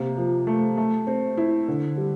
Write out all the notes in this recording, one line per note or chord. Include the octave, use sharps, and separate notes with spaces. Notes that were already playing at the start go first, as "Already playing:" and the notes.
Already playing: C3 A#3
F3
A3
A3
C4
E4
D3
G3